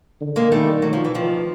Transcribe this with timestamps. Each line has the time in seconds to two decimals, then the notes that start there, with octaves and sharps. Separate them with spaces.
0.21 D3
0.36 G#3 A#3
0.52 D#3 G3 A3
0.82 F#3
0.93 F3
1.05 E3
1.15 D#3 F3